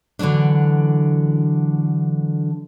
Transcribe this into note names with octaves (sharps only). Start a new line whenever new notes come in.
D3 E3 F#3 A3 D4